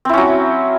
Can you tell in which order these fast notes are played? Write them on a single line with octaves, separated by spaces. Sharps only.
C4 E4 C#4 F#3